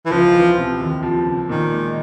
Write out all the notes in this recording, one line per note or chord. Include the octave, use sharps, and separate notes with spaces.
E3
C#2 F3
E3
C3
D#2
F3
C#3
A#2 D#3
G#3